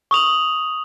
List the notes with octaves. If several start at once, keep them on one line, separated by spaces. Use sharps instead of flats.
C#6 D#6 F7 F#7